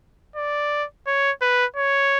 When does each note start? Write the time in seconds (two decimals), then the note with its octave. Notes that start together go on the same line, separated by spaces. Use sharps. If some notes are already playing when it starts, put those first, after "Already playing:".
0.36 D5
1.07 C#5
1.41 B4
1.77 C#5